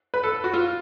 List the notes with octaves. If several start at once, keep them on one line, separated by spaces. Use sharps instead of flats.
B4
A4
F#4
F4